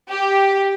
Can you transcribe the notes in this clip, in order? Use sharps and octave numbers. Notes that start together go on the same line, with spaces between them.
G4